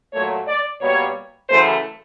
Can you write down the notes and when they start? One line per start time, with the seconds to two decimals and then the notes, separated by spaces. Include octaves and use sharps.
0.13 A#2 F#3 A3 C#5
0.47 D5
0.81 B2 G3 A#3 C#5
1.49 F#2 C#3 E3 A3 C5